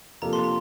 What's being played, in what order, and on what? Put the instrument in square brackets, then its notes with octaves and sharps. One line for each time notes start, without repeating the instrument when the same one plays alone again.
[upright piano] C3 F3 A#3 D4 A4 [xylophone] A#5
[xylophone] C6
A#5